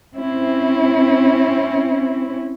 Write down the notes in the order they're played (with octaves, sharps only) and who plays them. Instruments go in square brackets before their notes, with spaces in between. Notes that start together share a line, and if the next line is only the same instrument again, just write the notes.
[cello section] C4 C#4 E4